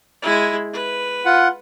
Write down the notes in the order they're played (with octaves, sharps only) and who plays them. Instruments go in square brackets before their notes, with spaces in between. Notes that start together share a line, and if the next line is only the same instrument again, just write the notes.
[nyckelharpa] G#3 E4
B4
[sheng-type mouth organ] F4 F#5